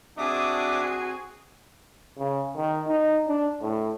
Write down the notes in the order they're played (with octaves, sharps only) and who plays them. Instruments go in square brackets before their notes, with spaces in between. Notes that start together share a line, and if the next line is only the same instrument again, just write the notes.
[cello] C4 G#4 [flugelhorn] D4 [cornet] F#4 [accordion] E5 D6 D#6
[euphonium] C#3
D#3
D#4
D4
A2